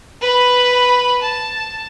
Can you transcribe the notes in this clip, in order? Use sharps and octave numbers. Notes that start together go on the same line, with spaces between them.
B4 B5
A5